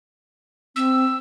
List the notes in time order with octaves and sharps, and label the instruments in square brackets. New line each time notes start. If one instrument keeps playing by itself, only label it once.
[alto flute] C4 [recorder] E6